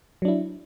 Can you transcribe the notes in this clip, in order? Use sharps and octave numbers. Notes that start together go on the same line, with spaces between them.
F#3 D4 E4